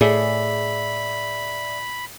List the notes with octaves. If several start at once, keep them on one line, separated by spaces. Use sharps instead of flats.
A2 G#4 D5 E5 B5